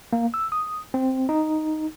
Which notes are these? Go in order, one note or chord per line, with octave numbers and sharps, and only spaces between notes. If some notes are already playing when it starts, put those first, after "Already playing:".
A#3
E6
D#6
C4
D#4